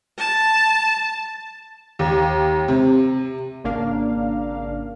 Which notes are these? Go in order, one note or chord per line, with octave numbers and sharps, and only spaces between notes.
A5
D#2
C3
G#1 C#3 A#3 D4 F5